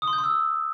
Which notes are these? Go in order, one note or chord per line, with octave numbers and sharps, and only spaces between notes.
D#6
C6
G6
C6
E6